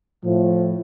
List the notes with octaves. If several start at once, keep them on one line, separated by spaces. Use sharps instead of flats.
A2 F3